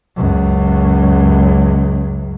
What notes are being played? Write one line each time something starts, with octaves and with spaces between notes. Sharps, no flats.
C#2 F#2